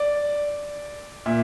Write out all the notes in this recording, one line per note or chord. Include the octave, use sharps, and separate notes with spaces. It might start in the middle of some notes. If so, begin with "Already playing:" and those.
Already playing: D5
A#2 E5